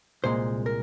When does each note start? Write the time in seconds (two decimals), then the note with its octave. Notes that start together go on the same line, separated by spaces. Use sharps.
0.24 C2 A#2 G#3 C5
0.66 A#4